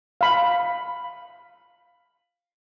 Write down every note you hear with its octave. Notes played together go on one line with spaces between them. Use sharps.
F5 B5